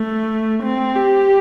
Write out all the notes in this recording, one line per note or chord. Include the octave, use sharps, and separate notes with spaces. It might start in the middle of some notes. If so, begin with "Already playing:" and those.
Already playing: A3
C4
G4